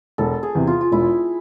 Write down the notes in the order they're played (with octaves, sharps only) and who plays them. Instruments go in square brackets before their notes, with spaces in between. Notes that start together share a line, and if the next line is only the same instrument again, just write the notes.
[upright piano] E1 [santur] A4
[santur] G#4
[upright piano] E2 C3
[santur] F4
F4
[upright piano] E1 [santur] E4